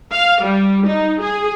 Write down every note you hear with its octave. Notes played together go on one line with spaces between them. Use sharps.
F5
G3
D#4
G#4